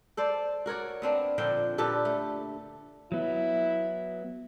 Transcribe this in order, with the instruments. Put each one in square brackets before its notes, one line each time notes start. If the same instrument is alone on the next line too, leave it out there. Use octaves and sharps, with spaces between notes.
[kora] A4 C5 D5
F#4 A#4 C#5 D5
B3 C4 D4
A#2 D3 F3 G5
A#2 G4 A4 B4
A3
[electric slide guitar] F#3 B3 [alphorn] E4